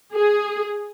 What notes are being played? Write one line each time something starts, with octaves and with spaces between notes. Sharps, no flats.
G#4